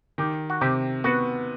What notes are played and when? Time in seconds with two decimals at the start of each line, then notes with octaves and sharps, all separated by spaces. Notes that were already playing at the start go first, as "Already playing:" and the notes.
0.18 D#3 G4
0.50 F#4
0.61 C3 G4
1.04 B3 F#4